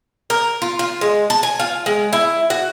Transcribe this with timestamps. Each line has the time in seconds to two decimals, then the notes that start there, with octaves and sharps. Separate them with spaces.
0.30 A#4
0.62 F4
0.79 F4
1.01 G#3
1.30 A5
1.43 G#5
1.60 F4
1.86 G#3
2.13 E4
2.50 F#4